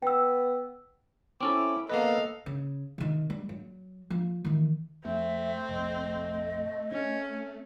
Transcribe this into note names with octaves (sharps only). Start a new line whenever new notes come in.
B3 G5 E6
C4 C#4 E4 A4 D6
A#3 B3 A4 B4 D#5 F5
C#3
C3 D#3
G3
F#3
F3
D#3 E3
F2 A3 C4 E5
F1 A#1 D#5
C4 C#4